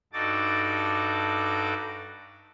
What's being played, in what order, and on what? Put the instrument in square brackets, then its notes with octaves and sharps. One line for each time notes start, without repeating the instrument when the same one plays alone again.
[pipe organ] G2 D#4 F#4 A4 D6 A6